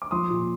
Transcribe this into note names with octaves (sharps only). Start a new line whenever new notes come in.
D6
F3 C6 D#6
A#2